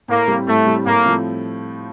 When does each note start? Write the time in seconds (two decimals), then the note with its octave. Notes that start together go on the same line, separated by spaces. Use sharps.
0.08 A2 A#3
0.28 G3 C4
0.47 A2 A3
0.67 G3 C4
0.86 A2 A#3
1.06 F3 A3 C4